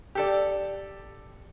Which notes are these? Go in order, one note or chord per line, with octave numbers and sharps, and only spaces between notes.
G4 A4 D5